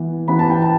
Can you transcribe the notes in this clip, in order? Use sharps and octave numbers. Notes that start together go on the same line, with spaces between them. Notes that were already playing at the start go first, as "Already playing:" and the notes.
Already playing: E3 B3
E3 B3 B5
A5
G5
A5